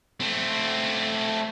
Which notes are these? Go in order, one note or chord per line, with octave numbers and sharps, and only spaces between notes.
A3 C4